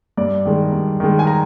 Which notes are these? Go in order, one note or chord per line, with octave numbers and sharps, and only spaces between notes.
G2 D5
D#3 G#3
G2
D#3 G#3
G#5
A#5